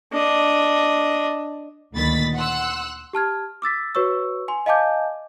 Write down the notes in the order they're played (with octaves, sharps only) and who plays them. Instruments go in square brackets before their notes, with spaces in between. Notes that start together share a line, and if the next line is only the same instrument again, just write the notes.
[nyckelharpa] D4 D#5
[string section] D2 A#2 D#3 B5 A6 B6
F#5 C6 E6 F#6
[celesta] G4 A5 F6 G#6
D6 E6 A6 B6
F#4 B4 C#5 C#6 E6
G#5 C6
D#5 F5 G#5 A5 D6 G6